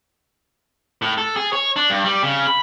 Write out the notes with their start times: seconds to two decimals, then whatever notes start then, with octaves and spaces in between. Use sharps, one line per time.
1.02 A2
1.18 A4
1.36 G#4
1.53 C#5
1.76 D4
1.90 G2
2.04 G3
2.23 C#3
2.47 B5